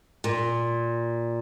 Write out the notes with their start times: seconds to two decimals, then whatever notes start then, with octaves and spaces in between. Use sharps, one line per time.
0.24 A#2